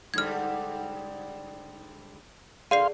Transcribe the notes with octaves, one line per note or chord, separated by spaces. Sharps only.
G#2 D3 G3 F6 G#6
A#2 D3 G#4 D5 F5 C6 C7